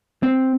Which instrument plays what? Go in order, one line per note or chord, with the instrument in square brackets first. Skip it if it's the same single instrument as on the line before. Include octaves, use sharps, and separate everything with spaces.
[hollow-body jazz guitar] C4